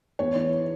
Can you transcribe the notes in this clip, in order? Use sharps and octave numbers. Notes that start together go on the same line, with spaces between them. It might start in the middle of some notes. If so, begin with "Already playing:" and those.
E2 C#5
E3